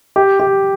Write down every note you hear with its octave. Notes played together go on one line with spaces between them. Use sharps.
G4
G4